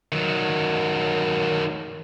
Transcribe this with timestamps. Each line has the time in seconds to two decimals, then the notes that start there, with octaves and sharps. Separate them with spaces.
0.12 D#3 F#3